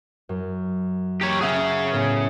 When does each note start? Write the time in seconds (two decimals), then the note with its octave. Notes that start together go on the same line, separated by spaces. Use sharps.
0.29 F#2
1.21 G4 C#5 A#5 C#6
1.41 C#4 G#4 E5 F#5 E6
1.92 A2 C#3 B3